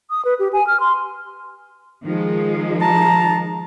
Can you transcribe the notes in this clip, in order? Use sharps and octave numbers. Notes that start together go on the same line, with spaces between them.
D#6
B4
G4
G#5
F6
C6
D#3 F3 G#3
A5 A#5